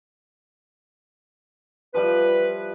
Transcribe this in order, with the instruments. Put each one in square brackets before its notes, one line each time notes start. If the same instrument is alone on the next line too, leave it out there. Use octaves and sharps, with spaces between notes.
[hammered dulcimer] F3 G3 E4 [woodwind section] B4